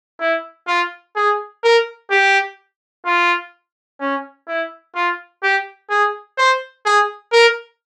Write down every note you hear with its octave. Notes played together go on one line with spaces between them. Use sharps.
E4
F4
G#4
A#4
G4
F4
C#4
E4
F4
G4
G#4
C5
G#4
A#4